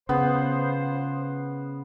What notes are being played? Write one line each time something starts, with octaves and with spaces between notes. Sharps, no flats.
C#3 F3 B3 C5